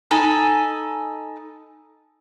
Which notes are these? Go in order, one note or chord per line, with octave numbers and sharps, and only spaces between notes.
D#4 A4 G#5 B5